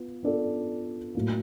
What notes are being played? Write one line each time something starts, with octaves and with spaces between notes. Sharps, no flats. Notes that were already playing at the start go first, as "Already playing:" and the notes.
Already playing: B3 F4
B3 D4 F4 A4 D5
A2 F#3 A#3